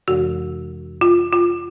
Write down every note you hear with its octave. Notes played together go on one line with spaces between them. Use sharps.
F2 C3 E3 G#3 F#4
F4
F4